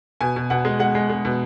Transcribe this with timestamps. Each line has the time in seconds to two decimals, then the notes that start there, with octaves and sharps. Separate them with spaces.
0.21 B2 G#5
0.36 B2
0.50 B2 F#5
0.65 G#3
0.80 G#3 F#5
0.95 G#3
1.09 G#3
1.25 B2